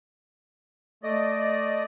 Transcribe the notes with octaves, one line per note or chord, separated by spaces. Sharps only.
A3 D5 D#5